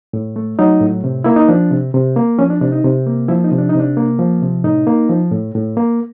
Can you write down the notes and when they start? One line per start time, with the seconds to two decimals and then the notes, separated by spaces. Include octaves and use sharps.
0.13 A2
0.36 A3
0.59 F#3 D#4
0.81 A2
1.04 C3
1.24 A#3 E4
1.36 D#4
1.48 F3 D4
1.71 C3
1.94 C3
2.16 A#3
2.39 F3 C#4
2.50 D4
2.61 C3 D4
2.72 D#4
2.84 C3
3.07 A#3
3.28 F3 E4
3.44 D#4
3.52 C3
3.58 D4
3.69 C3 D#4
3.80 D4
3.97 A#3
4.19 F3
4.42 C3
4.64 A2 D#4
4.87 A#3
5.09 F3
5.31 A2
5.55 A2
5.77 A#3